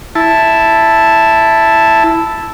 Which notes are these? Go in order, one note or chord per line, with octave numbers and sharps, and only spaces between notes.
E4 A5